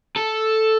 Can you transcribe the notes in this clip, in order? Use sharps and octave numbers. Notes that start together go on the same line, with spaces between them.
A4